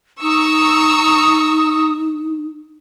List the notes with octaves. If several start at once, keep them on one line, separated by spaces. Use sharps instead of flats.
D#4 A#5 C#6 D#6 E6